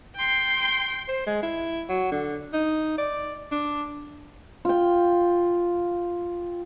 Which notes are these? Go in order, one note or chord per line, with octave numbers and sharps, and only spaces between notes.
G5 C6
C5
G#3
E4
F#3
D3
D#4
D5
D4
F4 G5